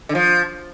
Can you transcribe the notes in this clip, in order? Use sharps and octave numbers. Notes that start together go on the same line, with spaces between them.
D3
F3